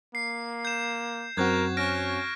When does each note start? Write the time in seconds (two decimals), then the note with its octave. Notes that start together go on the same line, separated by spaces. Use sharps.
0.15 A#3 C7
0.65 G6 E7
1.37 F#2 C4 F#4 A#4 C#6 F#6 G#6
1.77 C#4 F6 A#6 D7